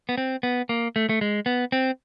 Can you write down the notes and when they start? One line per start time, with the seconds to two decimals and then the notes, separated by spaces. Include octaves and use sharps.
0.09 B3
0.18 C4
0.43 B3
0.69 A#3
0.96 A3
1.09 A3
1.21 G#3
1.46 B3
1.72 C4